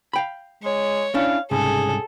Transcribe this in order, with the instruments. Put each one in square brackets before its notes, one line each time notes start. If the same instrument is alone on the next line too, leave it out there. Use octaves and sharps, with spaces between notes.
[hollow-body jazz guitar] F5 G5 B5
[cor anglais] G#3 [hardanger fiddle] C#5
[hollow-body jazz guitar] C#4 D4 E4 [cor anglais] F5
[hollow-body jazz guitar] C2 G#2 C#3 [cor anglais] G#4 [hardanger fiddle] A4